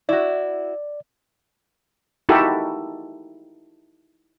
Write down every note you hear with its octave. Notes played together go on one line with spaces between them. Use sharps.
E4 F#4 D5
D#4 E4 F#4 G4 A4 A#4